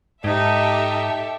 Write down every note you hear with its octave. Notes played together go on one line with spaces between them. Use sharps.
G#2 D#4 G4 A4 E5